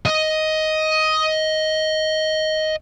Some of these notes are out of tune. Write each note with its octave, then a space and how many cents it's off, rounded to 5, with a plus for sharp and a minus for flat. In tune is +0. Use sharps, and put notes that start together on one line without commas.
D#5 +10